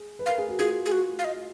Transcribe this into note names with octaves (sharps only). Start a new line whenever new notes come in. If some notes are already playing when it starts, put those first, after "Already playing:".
Already playing: G#4
B4
A#4 F5
G#4
F#4
F4 G#4
G#4
F#4
F5
D#5